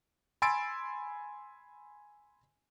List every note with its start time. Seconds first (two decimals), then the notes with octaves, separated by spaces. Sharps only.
0.42 G#5 B5 C6 E6 A6 D7